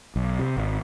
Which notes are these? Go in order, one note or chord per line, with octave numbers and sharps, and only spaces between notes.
B1
C3
G#1